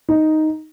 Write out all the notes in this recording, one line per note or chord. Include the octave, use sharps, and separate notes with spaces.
D#4